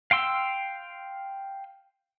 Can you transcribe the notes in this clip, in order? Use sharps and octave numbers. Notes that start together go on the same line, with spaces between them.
F5 G5 C6 E6